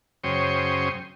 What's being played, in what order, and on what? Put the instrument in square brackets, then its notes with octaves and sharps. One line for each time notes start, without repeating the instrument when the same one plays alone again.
[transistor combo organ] F#2 C#3 C5 G5 C#6 D#6